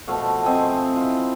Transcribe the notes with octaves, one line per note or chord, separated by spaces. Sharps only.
B2 F3 A3 F5
C4 D#5 G#5
E4 F4